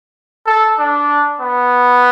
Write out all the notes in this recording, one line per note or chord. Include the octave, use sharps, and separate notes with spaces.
A4
D4
B3